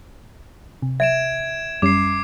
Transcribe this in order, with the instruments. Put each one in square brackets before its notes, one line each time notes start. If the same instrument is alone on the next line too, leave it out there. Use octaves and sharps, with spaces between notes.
[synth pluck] C3
[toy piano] E5 [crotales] G#6 D7 E7
[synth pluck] F#2 G3 C#4 [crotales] D6 C7